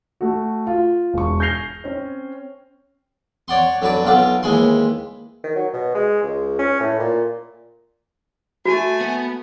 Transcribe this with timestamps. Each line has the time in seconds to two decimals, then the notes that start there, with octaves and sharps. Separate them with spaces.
0.21 A3 F#4
0.67 F4
1.14 E1 C#6
1.40 G6 G#6 A#6 C7 F7 G7
1.84 C4 C#4 C#5
3.48 C#5 D5 F#5 C6
3.82 D3 F#3 B4 D5
4.05 B1 F#3 F4 B4 D6
4.43 D#2 E3 G#3 G#5 B5 C6
5.44 D#3
5.55 F#3
5.73 B2
5.95 G#3
6.23 C#2
6.59 C#4
6.80 A2
6.99 A#2
8.65 A3 F#4 G#5
9.01 B3